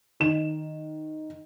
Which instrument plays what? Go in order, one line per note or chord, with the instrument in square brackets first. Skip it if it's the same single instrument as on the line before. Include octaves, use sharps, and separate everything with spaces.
[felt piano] D#3 E7